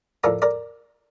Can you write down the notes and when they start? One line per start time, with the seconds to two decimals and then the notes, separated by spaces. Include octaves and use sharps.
0.24 A2 F3 A#4 D5
0.42 A#4 D5